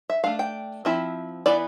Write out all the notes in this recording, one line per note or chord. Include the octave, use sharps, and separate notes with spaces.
E5
A3 D4 F5
G5
F3 C4 E4 E5
E3 B3 E4 D5